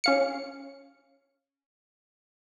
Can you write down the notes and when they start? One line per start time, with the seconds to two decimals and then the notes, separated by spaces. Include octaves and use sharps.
0.04 C#4 F5 C#7